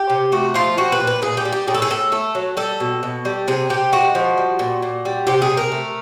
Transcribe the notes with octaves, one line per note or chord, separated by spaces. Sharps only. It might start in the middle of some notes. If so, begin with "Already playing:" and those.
Already playing: G4
C3
A3 F#4
F3 F4
G3 F#4
B4
A#2
B4
A#2 G#4
G4
G3
G4
A2 G#4
A4
G#4
A2 A4
A3 A4
F#3
G3 A4
B2
B2
G3
C3 G#4
C3 G4
G#3 F#4
F3
G3
A#2
A#2
G3
C3 G4
G#4
C3
A#4
A3